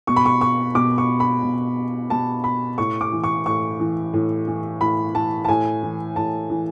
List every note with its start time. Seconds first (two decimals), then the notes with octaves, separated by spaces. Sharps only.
0.07 B2 C#6
0.16 B5
0.26 C#6
0.41 C#6
0.75 B2 D6
0.98 C#6
1.20 B5
1.43 B2
2.10 B2 A5
2.44 B5
2.78 A2 C#6
3.01 D6
3.12 E3
3.24 C#6
3.46 A2 C#6
3.80 E3
4.14 A2
4.47 E3
4.81 A2 B5
5.14 E3 A5
5.45 A5
5.48 A2 G#5
5.83 E3
6.16 A2 A5
6.50 E3